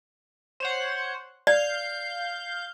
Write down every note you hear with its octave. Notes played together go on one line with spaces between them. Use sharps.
C5 C#5 F#5
D5 F5 G6